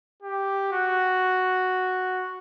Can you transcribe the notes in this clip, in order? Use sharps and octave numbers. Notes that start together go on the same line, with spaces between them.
G4
F#4